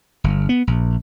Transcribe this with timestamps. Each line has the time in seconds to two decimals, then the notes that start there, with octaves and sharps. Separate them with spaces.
0.24 G1
0.49 B3
0.67 A#1